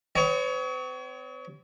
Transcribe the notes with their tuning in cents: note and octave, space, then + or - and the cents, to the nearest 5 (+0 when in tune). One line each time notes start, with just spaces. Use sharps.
C4 -45 C#5 +25